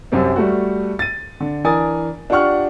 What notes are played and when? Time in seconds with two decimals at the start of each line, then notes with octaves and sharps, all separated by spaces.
0.12 C2 F#2 C3 C4
0.36 G3 A3 F#4
0.99 A6 D#7
1.40 D3
1.64 E3 D4 A#4 G#5 D#6 A6
2.30 D4 F4 G4 F#5 C#6 F6